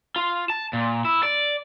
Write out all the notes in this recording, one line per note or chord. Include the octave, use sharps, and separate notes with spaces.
F4
A5
A#2
E4
D5